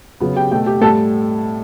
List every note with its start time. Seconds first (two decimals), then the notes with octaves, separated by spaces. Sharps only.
0.20 C#3 F#3 B3
0.36 G4 G5
0.51 B2 A3 G4 G5
0.66 G4 G5
0.81 A2 G3 A4 A5